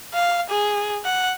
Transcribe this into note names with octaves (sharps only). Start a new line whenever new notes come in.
F5
G#4
F#5